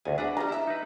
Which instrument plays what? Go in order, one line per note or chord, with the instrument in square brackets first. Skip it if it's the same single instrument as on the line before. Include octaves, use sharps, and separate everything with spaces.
[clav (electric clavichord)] D2 G#5 [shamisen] A3
[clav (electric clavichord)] D4 B4 [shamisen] F#4 G#4
[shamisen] G3 G#3 F4 [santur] A#5
[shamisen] E4 E5
[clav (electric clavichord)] D#4 B4